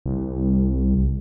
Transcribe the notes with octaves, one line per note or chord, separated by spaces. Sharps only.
C2